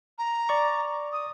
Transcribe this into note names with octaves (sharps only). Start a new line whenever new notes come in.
A#5
D5 C#6
D#6